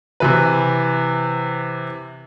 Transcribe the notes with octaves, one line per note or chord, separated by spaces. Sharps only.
C3 E3 B4